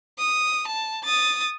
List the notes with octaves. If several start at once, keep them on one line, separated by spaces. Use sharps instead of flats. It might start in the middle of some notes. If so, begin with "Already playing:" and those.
D#6
A5
D#6 A6